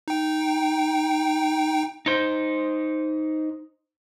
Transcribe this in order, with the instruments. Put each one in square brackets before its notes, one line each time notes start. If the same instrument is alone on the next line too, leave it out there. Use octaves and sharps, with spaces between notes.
[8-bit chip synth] D#4 G5
[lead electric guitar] D#4 C5